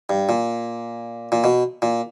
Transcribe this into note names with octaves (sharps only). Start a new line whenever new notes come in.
G2
A#2
A#2
B2
A#2